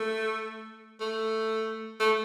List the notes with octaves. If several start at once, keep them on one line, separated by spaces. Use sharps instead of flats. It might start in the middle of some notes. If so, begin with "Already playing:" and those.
Already playing: A3
A3
A3